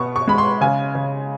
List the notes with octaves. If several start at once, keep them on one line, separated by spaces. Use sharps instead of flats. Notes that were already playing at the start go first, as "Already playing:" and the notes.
Already playing: B2 B3 C#6
C#6
G#3 B5
C6
C#3 G#5
C#3